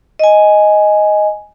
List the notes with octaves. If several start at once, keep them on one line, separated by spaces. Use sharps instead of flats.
D#5 G#5